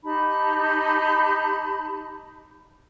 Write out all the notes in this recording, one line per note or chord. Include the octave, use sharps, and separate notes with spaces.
D#4 G4 A5 B5